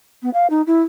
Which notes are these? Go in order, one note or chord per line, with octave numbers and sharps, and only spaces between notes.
B3
F5
D#4
E4